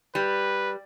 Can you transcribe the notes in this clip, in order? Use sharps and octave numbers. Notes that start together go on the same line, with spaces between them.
G3 B4